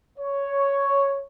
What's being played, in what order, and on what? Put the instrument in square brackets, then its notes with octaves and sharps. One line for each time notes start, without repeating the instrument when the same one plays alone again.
[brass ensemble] C#5